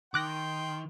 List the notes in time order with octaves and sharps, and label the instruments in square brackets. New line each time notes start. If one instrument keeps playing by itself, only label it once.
[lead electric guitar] D#3 [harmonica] G5 [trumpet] C6 [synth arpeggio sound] D6 F#6 A#6